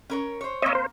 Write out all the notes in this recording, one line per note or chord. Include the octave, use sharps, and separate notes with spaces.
C#4 A#4 C#5
C5 C#5
A#3 C4 C#5 D#5 E5
C5